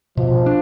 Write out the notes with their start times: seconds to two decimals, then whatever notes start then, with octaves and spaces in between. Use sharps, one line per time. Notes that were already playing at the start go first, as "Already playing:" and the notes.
0.17 B2 F3
0.46 D4